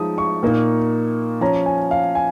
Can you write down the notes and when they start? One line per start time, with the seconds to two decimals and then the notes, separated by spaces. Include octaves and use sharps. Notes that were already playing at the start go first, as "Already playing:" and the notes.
Already playing: F3 G#3 D#4 D#6
0.18 C#6
0.43 A#2 A#3 D#4
1.41 F3 C#4 A#5
1.66 G#5
1.91 F5
2.15 G#5